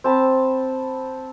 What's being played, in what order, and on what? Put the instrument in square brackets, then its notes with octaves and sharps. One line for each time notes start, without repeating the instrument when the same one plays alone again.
[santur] C4 A5 B5